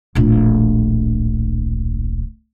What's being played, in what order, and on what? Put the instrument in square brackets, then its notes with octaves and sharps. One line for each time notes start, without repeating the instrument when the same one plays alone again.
[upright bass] D1 A#1